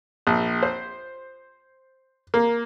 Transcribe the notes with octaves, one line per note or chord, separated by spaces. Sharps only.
A#1
C5
A#3